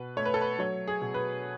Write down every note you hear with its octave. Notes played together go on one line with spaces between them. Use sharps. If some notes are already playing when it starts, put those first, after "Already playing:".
Already playing: B2 B4
A3 C#5
B4
A4
B4
F#3 C#5
G#4
B2
B4